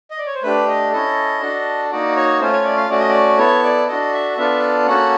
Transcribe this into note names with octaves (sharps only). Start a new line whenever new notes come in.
D#5
D5
C#5
C5
A3 D4 G4 B4
D#5
C#4 E4 A4 D#5
D4 F#4 A4
A#3 D#4 F#4 D5
C#5
A3 C#4 F4 C5
C#5
D5
F5
A3 C#4 F#4 D5
D#5
D5
B3 E4 A4 C#5
D5
D4 F#4 A4 D#5
E5
B3 D4 F4 A4 E5
A#3 C#4 F#4 A4 F#5